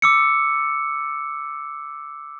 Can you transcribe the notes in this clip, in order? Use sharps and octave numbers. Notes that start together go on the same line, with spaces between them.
D6 E6 C#7